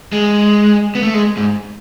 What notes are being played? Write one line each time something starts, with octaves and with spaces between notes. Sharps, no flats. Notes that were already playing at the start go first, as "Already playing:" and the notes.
G#3
B3
A3
G#3
G#2